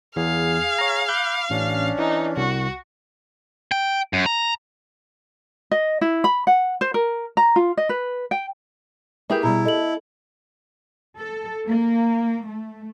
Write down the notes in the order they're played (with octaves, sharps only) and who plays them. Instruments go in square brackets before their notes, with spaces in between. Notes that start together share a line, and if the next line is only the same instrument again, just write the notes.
[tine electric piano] E2 [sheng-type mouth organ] G#4 [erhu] F5
[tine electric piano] C#5 A#5
[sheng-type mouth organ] B5 D6 [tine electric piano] F#6 G6
[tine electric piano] A1 [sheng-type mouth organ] C#4 D4
[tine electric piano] E3 [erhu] D#4
[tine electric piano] C2 [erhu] F#4
[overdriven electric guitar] G5
F#2
A#5
[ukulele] D#5
E4
B5
F#5
C5
A#4
A#5
F4
D#5
B4
G5
[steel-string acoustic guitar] A#3 E4 B4 [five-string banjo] G4 G#4 E5
[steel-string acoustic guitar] B2 G3 [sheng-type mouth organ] E4 [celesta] A#5
[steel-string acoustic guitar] A4 [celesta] D#5 F#7
[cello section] A4
A#3
A3